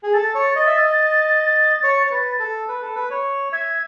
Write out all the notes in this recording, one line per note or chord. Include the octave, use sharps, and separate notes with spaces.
G#4
A4 A6
C#5
D#5
E5
D#5
C#5
C#5
B4
A4
B4
A4
B4
C#5
E5 G#6